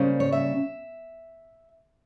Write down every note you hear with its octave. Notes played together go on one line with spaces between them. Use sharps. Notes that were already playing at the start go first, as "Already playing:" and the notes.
Already playing: C#3 G3 A#3 C#4 C5
C#5
E5